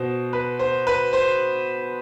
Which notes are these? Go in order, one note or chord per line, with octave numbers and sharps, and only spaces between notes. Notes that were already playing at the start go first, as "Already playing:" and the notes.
Already playing: B2 C5
B4
C5
B4
C5